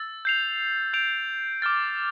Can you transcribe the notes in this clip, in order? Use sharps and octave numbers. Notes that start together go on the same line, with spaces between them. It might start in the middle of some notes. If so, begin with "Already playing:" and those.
Already playing: E6 A6
G6 C7 F7
G6 D7 F7
D6 F6 A6